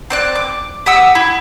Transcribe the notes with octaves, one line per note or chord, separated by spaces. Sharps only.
C4 D5 F#6
D6
G4 F#5 D#6 E6
E4